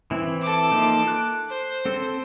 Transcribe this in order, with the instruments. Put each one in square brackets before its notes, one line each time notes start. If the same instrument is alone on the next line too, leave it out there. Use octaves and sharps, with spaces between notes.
[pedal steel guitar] E3 C4 E4
[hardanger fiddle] A4 D6
[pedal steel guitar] F3 A#3 D#4
F#6
[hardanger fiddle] C5
[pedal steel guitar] C4 A4